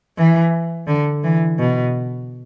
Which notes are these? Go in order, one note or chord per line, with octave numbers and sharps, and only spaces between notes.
E3
D3
E3
B2